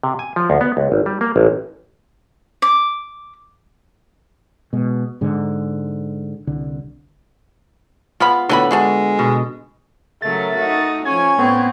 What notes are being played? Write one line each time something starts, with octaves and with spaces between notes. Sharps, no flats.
C3
G#5
F3
D2
B3
C#2
G#1
G3
A#3
A1
D6
B2 G#3
G#2 D3 G#3
C2 D3
G#3 B3 F4 B5
A2 D3 F#3 B3 A4 B5
G#3 D4 F#4 G#4
B2
C#3 F#3 A3 A#4 E5 A6
D#4 F#4
F3 C#4 G#5 C#6 G#6
A2 B3 C4